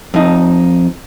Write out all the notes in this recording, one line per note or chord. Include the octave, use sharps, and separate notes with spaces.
F2 D#4